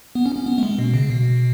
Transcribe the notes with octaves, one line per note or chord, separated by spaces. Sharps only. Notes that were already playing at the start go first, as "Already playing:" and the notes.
B3
C#4
C#4
B3
A3
G#3
B2
C#3
B2